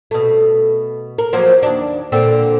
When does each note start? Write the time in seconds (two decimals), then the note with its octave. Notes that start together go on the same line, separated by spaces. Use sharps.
0.11 B2 A3
1.18 A#4
1.33 F3 F#3 A#3
1.63 D#2 D4
2.12 A#2 D3 C4